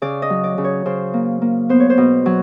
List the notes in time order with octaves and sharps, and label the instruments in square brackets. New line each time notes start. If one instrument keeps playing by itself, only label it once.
[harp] C#3 D5
D#5
F#3
D5
C#3
C#5
C#3 C5
A#3
A#3
B3 C5
C#5
C5
B2
F#3